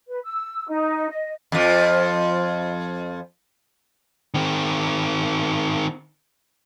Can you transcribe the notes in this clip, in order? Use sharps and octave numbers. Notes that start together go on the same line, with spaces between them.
B4
E6
D#4
D#5
F2 F3
D#3 C4